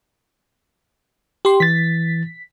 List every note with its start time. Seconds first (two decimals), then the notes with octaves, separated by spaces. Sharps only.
1.45 G4 C6
1.60 E3 A6 B6